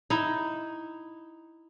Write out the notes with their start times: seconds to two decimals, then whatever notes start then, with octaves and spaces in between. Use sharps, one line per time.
0.10 D#4 E4